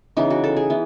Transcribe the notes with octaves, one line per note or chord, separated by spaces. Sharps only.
C#3 E3 B3 D#4
F#4
A4
G#4
E3 B3